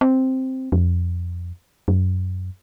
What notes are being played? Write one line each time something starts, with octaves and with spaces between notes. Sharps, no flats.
C4
F2
F#2